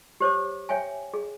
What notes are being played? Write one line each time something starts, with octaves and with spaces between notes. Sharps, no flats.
G4 C5 C#5 D6
C#5 E5 G5 G#5
G#4